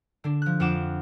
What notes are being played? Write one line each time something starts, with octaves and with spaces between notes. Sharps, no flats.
D3 D4
F3 F#6
F2 D4 F4 F#5 D6 E7